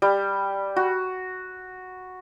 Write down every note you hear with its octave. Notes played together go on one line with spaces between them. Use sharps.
G3
F#4